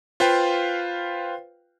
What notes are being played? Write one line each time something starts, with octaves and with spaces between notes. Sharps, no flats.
F4 B4 C5 F5 G5